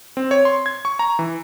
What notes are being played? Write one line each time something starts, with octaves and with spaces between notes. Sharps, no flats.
C4
C#5
C6
G#6
C#6
A#5
E3